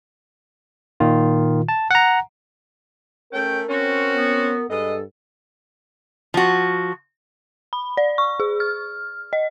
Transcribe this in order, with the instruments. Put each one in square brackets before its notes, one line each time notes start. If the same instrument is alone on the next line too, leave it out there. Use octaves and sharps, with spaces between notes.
[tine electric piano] A#2 D#3 F4
A5
F#5 A#5
[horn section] A3 C#4 [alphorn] A#4 [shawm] G5
[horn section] C4 C#4 [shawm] F#4
[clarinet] B3
[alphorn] G2 [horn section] G#3 B4 D#5 [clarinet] A4
[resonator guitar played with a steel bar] F3 F#4
[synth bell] B5
D5
C#6
G#4
F6
D#5